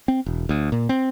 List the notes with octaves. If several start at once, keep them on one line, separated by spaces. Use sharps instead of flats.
C4
E1
D2
A#2
C4